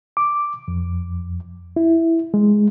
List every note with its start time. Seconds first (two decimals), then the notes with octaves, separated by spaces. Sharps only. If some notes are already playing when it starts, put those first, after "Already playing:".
0.17 D6
0.68 F2
1.76 E4
2.34 G#3